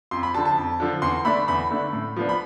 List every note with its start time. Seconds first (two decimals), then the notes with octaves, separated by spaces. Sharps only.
0.11 F2 C6
0.23 B5
0.34 D3 F3 A5
0.45 A5
0.58 F2
0.80 D3 F3
1.02 E2 C6
1.25 D3 A3 D4 B5
1.48 E2 B5
1.71 D3 A3 D4
1.93 A2
2.16 F3 B3 D4
2.29 B5